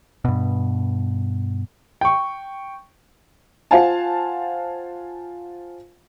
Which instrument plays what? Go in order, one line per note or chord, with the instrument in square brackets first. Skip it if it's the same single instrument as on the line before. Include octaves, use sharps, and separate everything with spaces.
[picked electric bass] G2 B2
[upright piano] G5 C#6
[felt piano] F4 C5 F5 F#5 G#5 A5